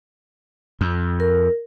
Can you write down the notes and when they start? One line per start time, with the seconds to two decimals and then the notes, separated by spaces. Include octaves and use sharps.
0.81 F2
1.20 A#4